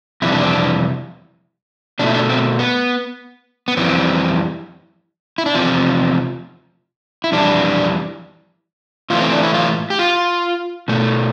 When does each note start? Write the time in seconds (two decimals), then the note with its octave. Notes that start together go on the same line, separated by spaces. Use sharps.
0.22 F2 C3 E3 G3 E4
0.32 D4
0.43 C4
0.53 D4
1.99 B2 A3 D4
2.07 E4
2.14 D4
2.29 C4
2.59 B3
3.68 B3
3.77 F2 E3 G3 C4
5.38 E4
5.46 D4
5.55 E2 C3 F3 C4
7.24 E4
7.32 F2 E3 G3 D4
9.10 A2 E3 A3 F4
9.21 C4
9.32 D4
9.43 E4
9.54 F4
9.90 G4
9.99 F4
10.88 B2 A3